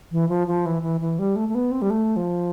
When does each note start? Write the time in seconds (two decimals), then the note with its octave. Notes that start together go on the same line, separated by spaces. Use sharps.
0.12 E3
0.29 F3
0.47 F3
0.66 E3
0.83 E3
1.01 E3
1.19 G3
1.36 A3
1.49 A3
1.55 B3
1.71 C4
1.82 G3
1.90 A3
2.16 F3